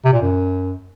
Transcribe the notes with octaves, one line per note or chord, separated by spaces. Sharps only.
C3
A#2
F#2